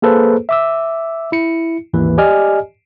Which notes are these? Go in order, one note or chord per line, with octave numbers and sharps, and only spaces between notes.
A#3 G#4 A4 B4 C5
E5 D6 E6
E4 C#7
G#1 D#2 E3 B4
G4 D5 D#5 G#5 F6